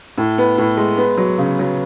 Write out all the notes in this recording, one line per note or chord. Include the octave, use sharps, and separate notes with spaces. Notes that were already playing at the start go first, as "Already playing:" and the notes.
A2
B3
A2
G#3
B3
F#3
C#3
F#3